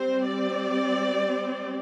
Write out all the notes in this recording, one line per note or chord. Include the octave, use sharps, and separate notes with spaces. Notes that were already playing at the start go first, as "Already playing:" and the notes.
Already playing: G3 C4 C5
D5